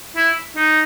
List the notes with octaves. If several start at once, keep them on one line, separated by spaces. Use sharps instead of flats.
E4
D#4